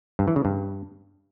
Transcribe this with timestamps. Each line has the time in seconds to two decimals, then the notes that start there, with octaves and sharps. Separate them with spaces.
0.19 G2
0.28 E3
0.36 C#3
0.45 G2